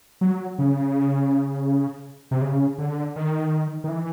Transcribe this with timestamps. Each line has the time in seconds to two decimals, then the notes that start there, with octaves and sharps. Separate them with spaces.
0.21 F#3
0.59 C#3
2.31 C3
2.41 C#3
2.78 D3
3.16 D#3
3.84 D#3
3.89 E3